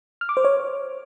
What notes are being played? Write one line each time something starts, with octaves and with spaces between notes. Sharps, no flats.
F6
D6
C5
C#5